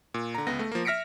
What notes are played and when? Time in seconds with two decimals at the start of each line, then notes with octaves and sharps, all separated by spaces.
0.14 A#2
0.35 D3 A#5
0.47 C#2 B3 A#6
0.59 A3
0.72 F3 A#3
0.85 E5 F6 A#6 B6 C#7 D7